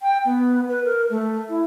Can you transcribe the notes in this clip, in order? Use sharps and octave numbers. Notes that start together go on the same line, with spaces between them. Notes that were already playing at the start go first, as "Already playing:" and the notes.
G5
B3
B4
A#4
A3
E4